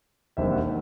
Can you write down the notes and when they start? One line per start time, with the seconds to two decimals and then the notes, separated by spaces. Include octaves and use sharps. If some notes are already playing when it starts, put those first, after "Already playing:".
0.37 E1 D#2 D#3 G3 C4 E5
0.52 F#5